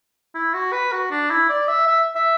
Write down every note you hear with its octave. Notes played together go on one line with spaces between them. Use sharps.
E4
F#4
B4
F#4
D4
E4
D5
E5
E5
E5